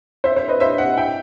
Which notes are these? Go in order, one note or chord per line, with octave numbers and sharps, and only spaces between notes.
C5 E5
C5
B4 D#5
C5 E5
D#5 F#5
E5 G5